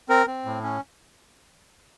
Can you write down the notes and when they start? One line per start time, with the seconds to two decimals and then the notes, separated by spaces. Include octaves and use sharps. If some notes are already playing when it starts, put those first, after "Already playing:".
0.09 C4 A#4
0.27 C4
0.45 A2
0.63 C#4